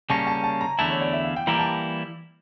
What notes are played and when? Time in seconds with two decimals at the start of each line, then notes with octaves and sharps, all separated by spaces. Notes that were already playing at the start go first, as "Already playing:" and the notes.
0.10 C#3 G3 A#3 C#4 A5
0.27 A5
0.44 A5
0.61 A#5
0.79 E2 D3 A3 E4 A5
0.90 C#5
1.01 D5
1.13 E5
1.24 F5
1.36 G5
1.47 E3 G3 A#3 E4 G4 A#5
1.59 A5